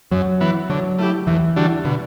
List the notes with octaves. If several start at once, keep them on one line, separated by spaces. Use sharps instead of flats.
F#2 F#3
E3 B3
D3 F#3
A3 E4 G4
E2 E3
D3 G3 D4 F#4
B2 D3